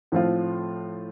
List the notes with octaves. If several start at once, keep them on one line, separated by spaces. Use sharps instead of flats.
A2 F3 C4 F4